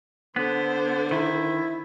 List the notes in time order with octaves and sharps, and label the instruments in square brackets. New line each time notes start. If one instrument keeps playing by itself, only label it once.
[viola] D3 C5 [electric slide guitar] B3
[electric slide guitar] D#3 [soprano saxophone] E4